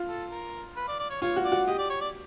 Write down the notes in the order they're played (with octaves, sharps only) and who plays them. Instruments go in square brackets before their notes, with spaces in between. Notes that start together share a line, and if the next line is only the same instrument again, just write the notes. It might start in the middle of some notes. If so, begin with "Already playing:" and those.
Already playing: [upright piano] F4
[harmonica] A4
A#4
B4
D5
D5
C#5
[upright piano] F4 [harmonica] C#5
[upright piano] F#4
[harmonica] D5
[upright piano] F#4
[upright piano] G4 [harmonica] D#5
[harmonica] D5
C#5
D5